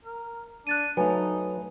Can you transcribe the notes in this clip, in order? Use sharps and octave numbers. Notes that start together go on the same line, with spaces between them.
A#4
D4 F#6 A6 D#7
F#3 A3 D#4 B4 G#5